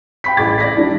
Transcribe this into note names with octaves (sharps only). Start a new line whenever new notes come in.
G5 B5 B6
A1 G#4 D6 A6
D5 A#6 B6
D#3 G3 D4 E4